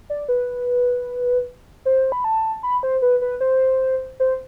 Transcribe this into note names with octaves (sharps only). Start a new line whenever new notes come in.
D5
B4
C5
B5
A5
B5
C5
B4
B4
C5
C5